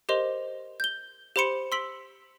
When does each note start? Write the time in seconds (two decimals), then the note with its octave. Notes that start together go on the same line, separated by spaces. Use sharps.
0.09 G4 A#4 C5 D#5 C6 F7
0.80 G6 G7
1.36 G4 C5 B5 C6 C#7 E7
1.72 C6 E6 B6 D7 F#7